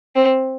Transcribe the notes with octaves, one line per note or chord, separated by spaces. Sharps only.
C4